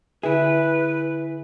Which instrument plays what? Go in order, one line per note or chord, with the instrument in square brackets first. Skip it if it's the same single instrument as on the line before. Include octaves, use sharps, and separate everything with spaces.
[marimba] D3 E5 [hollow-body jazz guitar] E4 G#4 [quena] B4